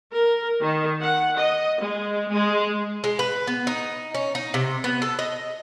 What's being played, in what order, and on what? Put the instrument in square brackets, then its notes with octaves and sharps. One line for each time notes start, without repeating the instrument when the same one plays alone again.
[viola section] A#4
D#3
F#5
D#5
G#3
G#3
[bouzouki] G#3
B4
B3
D#4
C#4
D#4
C3
B3
A4
D#5